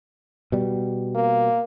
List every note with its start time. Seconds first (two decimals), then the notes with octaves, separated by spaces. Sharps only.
0.52 B2 G3
1.15 A#3